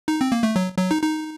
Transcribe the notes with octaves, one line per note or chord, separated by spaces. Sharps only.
D#4
C4
A#3
A3
F#3
F#3
D#4
D#4